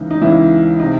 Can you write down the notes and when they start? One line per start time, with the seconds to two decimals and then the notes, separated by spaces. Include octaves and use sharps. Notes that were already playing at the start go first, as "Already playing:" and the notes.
Already playing: C#2 C#3 E3 D#4
0.11 D#4
0.21 C#2 C#3 E3 E4
0.80 C3 D#4